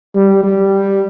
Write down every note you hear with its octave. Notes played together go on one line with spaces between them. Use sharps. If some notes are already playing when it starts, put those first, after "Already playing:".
G3
G3